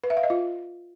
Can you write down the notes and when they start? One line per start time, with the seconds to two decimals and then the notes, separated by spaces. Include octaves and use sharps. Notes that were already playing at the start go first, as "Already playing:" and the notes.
0.04 B4
0.10 E5
0.17 F5
0.23 D#5
0.30 F4